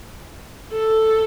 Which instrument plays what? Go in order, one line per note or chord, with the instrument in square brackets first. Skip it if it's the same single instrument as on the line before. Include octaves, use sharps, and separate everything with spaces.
[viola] A4